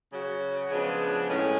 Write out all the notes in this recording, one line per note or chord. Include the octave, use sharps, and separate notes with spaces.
C#3 F#3 C#4 F#4
C#3 F3 G#3 B3 D4
A2 G#3 C#4